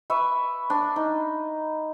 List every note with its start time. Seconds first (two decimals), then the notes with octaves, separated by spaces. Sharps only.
0.10 B4 E5 C#6
0.70 D4
0.96 D#4